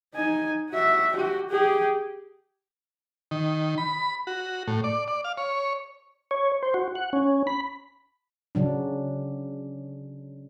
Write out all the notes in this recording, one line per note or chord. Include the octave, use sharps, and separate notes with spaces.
D#4 G#5
F#4 E5
F#4 G4
G4 G#4
D#3
B5
F#4
A2
D5
D5
F5
C#5
C#5
C5
F#4
F#5
C#4
B5
C#3 F#3 D4